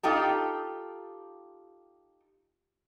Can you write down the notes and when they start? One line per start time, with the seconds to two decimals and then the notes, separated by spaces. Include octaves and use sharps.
0.03 D#4 F4 G4 A4